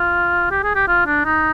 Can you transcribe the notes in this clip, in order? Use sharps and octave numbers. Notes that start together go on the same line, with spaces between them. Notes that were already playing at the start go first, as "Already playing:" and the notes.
Already playing: F4
G4
G#4
G4
F4
D4
D#4